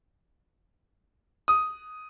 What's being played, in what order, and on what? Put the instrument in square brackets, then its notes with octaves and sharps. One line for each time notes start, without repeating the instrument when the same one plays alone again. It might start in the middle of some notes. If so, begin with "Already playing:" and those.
[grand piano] D#6